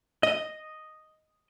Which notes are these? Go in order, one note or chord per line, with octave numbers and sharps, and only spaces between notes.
D#5